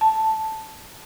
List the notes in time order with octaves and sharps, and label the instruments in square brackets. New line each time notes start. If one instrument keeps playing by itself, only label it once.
[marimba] A5